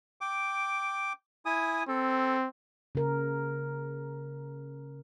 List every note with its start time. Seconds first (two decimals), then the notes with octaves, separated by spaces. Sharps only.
0.21 G5 D6
1.46 E4 G#5 D#6
1.89 C4 A4
2.95 C#3 A#4